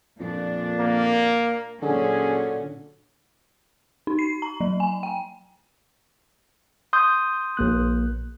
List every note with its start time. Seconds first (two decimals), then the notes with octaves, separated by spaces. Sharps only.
0.20 F2 A#2 D4
0.80 A#3
1.83 A#2 D3 F#3 C#4 G#4
4.07 D#4
4.19 C7
4.42 A#5
4.61 F#3
4.80 G#5
5.03 G5
6.93 C6 D#6 G6
7.57 A#1 A#3 F#6